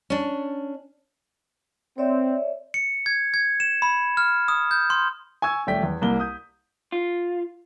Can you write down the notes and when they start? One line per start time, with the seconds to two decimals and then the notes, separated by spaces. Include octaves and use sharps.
0.10 C#4 D4
1.98 C4 C#5 D5 E5
2.74 C#7
3.06 G#6
3.34 G#6
3.60 E7
3.82 B5
4.17 F6
4.48 D#6
4.71 G6
4.90 C6
5.42 G#5 C#6 E6 G#6
5.67 D#1 A3 D5 G5 B6
5.83 E2
6.01 C2 A#3 G7
6.19 D#6 G6
6.92 F4